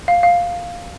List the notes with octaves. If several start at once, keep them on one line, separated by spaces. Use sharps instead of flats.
F5
F5